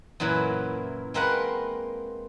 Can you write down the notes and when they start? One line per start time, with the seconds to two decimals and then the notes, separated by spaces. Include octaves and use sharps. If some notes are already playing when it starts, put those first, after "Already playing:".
0.20 F#2 A#2 E3 F#3 E4
1.14 G#3 A#3 C4 A#4 B4 F#5